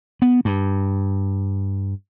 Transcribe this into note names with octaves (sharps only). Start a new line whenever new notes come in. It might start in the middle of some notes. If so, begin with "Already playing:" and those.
B3
G2